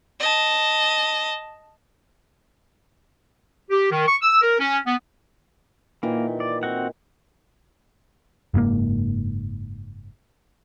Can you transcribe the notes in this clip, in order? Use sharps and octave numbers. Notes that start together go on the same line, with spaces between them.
D#5 A5
G4
D#3
C#6
E6
A#4
C#4
B3
A#2 D#3 E3 A#3
D5
C4 F#4 F#5
F#1 G#2 C#3 A#3